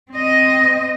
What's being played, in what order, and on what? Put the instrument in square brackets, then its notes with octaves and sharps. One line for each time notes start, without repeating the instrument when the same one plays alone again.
[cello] C4 D#5